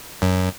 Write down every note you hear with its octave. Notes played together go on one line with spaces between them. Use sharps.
F#2